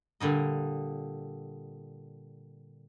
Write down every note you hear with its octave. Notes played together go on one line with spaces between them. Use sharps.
A#2 D3 G3 D#5